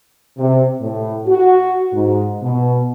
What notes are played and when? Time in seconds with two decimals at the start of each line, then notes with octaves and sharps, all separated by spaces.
0.38 C3
0.81 A2
1.27 F#4
1.93 G#2
2.43 B2